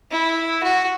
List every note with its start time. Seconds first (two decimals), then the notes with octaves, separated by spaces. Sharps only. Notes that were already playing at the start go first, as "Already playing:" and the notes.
0.11 E4
0.64 F#4